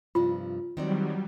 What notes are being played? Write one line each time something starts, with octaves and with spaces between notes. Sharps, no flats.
G2 C3 F3 F4
D#3 F#3 G3 C4 D5